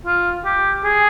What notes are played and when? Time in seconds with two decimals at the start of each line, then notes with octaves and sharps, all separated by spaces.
0.06 F4
0.45 G4
0.84 G#4